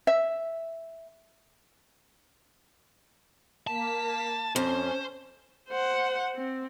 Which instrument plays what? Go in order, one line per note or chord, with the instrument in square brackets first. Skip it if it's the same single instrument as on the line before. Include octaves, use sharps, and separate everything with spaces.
[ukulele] E5
[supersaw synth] A#3 B6 [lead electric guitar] A5
[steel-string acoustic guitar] F2 [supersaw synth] C#4 [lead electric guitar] C5
[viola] C5 F#5
C4